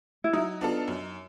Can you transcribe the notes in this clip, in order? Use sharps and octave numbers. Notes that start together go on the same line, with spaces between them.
E4
F#3 D#4
B3 D4 F4 A4
F#2